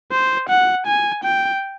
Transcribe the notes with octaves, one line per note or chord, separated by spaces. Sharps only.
C5
F#5
G#5
G5